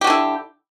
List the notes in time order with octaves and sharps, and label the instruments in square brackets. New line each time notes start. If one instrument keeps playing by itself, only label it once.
[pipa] G4
F#4
D3
E4